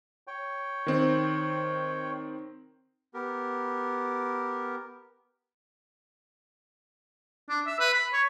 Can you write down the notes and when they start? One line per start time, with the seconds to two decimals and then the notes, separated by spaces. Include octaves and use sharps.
0.27 C#5 G5
0.86 D#3 C4
3.14 B3 G4 A#4
7.49 D4
7.67 E5
7.80 B4
7.94 B5
8.13 C#5